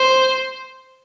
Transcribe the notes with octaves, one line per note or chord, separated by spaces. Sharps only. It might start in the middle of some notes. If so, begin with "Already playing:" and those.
Already playing: C5